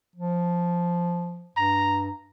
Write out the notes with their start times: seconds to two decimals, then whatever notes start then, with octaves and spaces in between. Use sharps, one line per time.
0.16 F3
1.57 G2 A#5